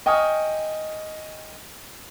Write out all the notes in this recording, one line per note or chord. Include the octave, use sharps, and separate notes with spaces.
D#5 G5 G#5 C#6 D#6 F6